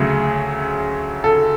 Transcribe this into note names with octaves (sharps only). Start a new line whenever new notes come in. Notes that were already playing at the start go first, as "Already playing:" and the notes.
Already playing: D2 C#3 F#3 A3 G#4
A4